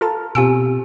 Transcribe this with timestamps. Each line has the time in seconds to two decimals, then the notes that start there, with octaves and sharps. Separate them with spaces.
0.01 F4 A4 A5 A#5 F6
0.35 B2 C4 F4 G4 G#5 E6 D7